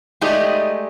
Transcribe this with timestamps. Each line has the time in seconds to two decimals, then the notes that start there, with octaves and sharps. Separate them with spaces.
0.21 G#3 A3 D#4 G4 D5 D#5